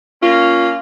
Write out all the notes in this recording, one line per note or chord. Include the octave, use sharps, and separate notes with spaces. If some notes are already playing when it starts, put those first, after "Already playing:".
A#3 C#4 F4